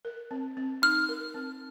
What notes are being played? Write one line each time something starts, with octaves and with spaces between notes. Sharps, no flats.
A#4
C4
C4
D#4 F6
A#4
C4